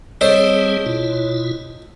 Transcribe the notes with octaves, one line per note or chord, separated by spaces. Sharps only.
G3 C4 G#4 A4 C5 C#5 D#5
B2 E4 F4